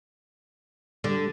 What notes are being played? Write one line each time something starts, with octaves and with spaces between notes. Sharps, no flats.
D3 G3